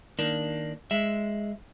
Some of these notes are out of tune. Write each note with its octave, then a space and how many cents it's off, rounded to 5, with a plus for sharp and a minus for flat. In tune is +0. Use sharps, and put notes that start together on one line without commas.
D#3 +0 A#3 +0 D4 +0
G#3 +0 E5 +0